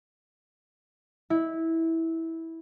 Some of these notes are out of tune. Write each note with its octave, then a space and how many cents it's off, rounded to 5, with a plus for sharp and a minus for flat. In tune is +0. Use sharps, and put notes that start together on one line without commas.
E4 -15